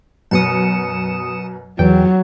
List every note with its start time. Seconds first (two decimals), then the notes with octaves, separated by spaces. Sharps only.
0.31 F#2 B2 D#6 C#7 E7
1.79 E2 F#3 G5